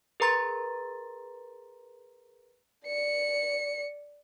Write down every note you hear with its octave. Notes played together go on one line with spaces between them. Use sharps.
G#4 A#4 B4 A#5 C6 A6
D5 C#7